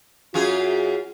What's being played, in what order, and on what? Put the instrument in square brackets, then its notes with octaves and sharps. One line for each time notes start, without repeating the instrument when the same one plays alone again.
[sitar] F#2 F4 G#4 [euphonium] F#4